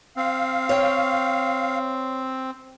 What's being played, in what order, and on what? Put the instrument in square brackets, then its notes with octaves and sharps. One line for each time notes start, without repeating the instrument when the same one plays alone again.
[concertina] C4 [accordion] F5
[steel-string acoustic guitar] C#5 G5